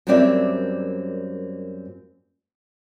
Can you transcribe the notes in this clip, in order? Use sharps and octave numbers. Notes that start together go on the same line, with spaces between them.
F#2 G3 A#3 C4 D5 E5